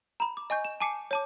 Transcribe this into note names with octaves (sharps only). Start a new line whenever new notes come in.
A#5 B5
D6
D#5 G#5 C#6 G6
E7
G#5 A5 D6 C7 C#7
C#5 A5 D6